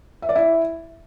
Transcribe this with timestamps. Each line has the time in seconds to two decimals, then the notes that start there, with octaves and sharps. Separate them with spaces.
0.22 E5
0.29 D5
0.35 E4